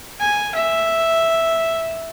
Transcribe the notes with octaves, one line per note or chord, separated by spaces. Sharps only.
G#5
E5